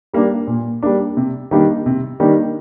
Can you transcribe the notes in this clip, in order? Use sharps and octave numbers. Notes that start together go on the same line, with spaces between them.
G3 A#3 D4
A#2
G3 A#3 D4
C3
D#3 G3 A#3 D4
C3
D#3 G3 A#3 D4